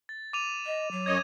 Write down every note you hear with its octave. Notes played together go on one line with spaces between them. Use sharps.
A6
D6 D#7 F7
D#5
F#3
F#2 C#5 D#5 G#6 D#7